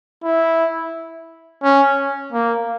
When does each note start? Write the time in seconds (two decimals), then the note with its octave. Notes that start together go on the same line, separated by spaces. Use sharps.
0.24 E4
1.63 C#4
2.33 A#3